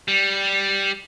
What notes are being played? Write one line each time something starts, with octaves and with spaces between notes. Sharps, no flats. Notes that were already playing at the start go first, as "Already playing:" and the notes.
G3